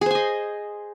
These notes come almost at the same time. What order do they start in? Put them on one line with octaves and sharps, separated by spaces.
G#4 C5 G#5 D#5